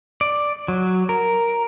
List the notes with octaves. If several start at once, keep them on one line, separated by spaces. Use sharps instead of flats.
D5
F#3
A#4